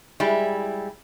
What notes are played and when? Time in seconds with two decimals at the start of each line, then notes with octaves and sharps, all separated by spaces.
0.20 G3 G#3 E4